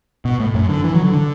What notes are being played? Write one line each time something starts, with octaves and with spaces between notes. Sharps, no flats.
B2
A2
F#2
D3
E3
F#3
D3
D3